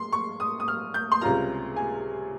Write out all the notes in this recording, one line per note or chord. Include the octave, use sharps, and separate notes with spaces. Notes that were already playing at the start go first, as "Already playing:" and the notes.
Already playing: G#3 C6
C#6
D#6
D#6
F6
G6
C6
C#2 C3 G3 C#4 F4 A#5
G#5